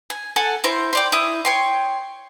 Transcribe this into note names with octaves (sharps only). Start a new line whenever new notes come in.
G#5
A4 F#5 G#5
E4 C5 A#5
C5 D5 G5
E4 D#6
C#5 G5 C6